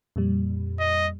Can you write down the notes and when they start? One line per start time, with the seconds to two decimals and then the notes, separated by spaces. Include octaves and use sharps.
0.16 F2 A#2 G3
0.79 D#5